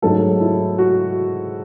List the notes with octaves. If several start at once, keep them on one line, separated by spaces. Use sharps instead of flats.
G#2 F#3 A3 A4
E4
F#4